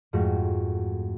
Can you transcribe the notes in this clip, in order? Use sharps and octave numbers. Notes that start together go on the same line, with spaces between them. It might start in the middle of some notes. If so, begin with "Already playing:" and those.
F2 G#2 A3 F#4 F5